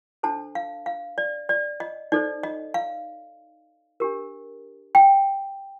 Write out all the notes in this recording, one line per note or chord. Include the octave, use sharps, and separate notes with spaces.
D4 A4 C5 A5
F5
F5
D5
D5
D#5
D#4 A4 C5 D5
D#5
F5
D4 G4 A#4
G5